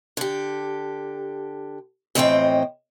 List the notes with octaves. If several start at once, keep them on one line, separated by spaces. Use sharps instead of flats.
D3 G4
F2 A2 E3 C4 D#5 G5